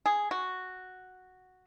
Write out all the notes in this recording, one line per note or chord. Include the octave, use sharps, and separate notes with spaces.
G#4
F#4